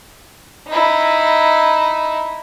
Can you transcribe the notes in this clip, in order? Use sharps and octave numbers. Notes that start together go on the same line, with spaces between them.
D#4 E4